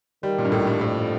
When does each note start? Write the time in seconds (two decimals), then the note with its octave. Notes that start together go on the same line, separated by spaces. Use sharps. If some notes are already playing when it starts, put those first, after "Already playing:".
0.23 D#3 G3
0.38 A#2
0.45 G2
0.52 A2
0.67 G2
0.81 F2 A2